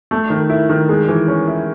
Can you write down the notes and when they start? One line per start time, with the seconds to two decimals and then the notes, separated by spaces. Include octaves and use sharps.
0.11 A3
0.30 D#3
0.50 E4
0.69 D#3
0.89 G#3
1.09 E3
1.28 C#4
1.47 E4